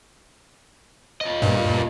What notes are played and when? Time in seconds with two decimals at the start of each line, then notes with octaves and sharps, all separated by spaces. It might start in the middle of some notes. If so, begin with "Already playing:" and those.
1.21 F4 D#5
1.42 G2 A#2